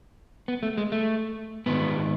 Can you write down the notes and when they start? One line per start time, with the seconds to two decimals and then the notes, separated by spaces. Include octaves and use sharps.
0.48 B3
0.63 A3
0.78 G#3
0.92 A3
1.66 G#2 D#3 B3